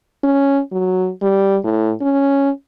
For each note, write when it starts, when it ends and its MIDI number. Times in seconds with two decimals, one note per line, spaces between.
0.23 0.60 61
0.72 1.10 54
1.22 1.57 55
1.64 1.92 45
2.01 2.50 61